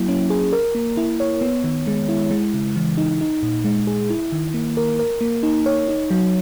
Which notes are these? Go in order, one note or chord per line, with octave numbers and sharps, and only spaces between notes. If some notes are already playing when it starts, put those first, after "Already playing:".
Already playing: F#3 A#3 E4
C#4
G#4
A#4
A#3
E4
C#5
B3
D#3
G#3
E4
G#3
C#3
E3
D#4
D#4
A#2
G#3
G#4
E4
D#3
A#3
A#4
A#4
A#3
D#4
C#5
D#4
F#3